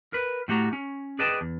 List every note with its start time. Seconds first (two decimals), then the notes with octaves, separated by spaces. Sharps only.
0.13 A#4 B4
0.48 A2 G3 A3 F#4 G4 A#5
0.73 C#4
1.19 G#4 B4 D5 D#5 G5 A5
1.41 E2